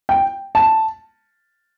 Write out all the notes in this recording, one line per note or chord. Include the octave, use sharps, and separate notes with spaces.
G5
A5